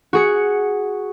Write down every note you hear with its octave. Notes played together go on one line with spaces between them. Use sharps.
F#4 G#4 C#7